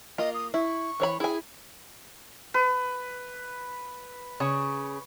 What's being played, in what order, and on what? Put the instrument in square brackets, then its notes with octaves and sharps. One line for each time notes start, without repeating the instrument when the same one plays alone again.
[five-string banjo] A#3 F4 [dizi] D#5
[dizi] D#6
[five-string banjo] E4 [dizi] C#6
[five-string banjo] E3 C#5 B5
[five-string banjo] E4 G#5 [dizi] G#4
[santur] B4
[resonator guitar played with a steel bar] C#3 [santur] C#6